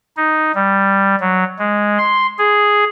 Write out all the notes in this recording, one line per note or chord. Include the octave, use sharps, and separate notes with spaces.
D#4
G3
F#3
G#3
C6
G#4